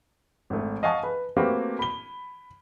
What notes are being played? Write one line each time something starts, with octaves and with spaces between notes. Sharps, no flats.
G#1 A3
D#5 F5 F#5 G#5 A5 C#6
B4
A3 A#3 C4 F#4 G4 B4
B5 G7